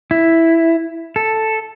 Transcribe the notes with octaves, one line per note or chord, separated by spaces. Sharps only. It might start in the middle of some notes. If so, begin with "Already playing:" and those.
E4
A4